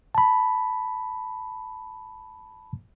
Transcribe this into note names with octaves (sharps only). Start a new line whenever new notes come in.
A5 B5